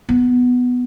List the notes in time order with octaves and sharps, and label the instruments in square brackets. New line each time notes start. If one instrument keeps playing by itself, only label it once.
[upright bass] B3